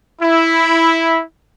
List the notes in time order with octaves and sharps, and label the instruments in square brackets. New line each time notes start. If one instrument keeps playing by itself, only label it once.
[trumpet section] E4